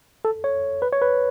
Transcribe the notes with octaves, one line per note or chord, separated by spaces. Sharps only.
A4
C#5
B4
C#5
B4